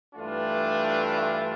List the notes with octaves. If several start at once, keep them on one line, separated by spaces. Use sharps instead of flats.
G2 E3 A3 D4 F4